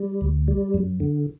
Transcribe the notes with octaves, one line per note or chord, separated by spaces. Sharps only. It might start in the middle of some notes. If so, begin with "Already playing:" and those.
Already playing: G3
D2
G3
F#2
D3